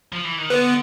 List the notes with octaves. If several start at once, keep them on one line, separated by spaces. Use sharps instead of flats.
F3
E3
D#3
D3 B3